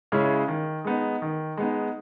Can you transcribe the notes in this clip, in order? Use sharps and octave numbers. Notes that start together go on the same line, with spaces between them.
C#3 G#3 C#4 E4
D#3
G#3 B3 D#4
D#3
G#3 B3 D#4